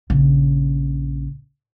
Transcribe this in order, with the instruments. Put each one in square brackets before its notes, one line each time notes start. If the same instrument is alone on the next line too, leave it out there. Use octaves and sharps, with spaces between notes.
[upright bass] A#1 C#3